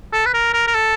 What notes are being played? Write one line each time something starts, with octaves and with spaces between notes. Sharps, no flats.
A4
B4
A#4
A#4
A#4
A4